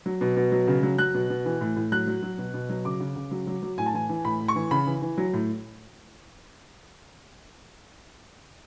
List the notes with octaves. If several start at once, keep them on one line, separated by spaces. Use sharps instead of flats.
F#3
B2
B2
F#3
C#3
F#3
F#3 F#6
B2
B2
E3
A2
A2
F#3 F#6
F#3
F#3
B2
B2
F#3
C#3 D6
C#3
C#3
F#3
F#3
F#3
A2 G#5
A5
E3 G#5
E3
A2 B5
A2
C#6
E3
C#3 B5
E3
E3
F#3
A2